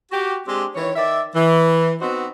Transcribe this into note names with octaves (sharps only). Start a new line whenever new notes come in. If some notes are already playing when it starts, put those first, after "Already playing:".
F#4 G4
G#3 C4 D4 G4
D#3 E3 C#5
D#3 D5 E5
E3
B3 C4 D#4 F#4 C5